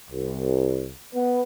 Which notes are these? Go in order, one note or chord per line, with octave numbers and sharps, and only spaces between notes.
C2
B3